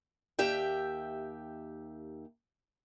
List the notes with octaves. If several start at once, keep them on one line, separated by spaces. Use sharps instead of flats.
D#2 G4 E5 G5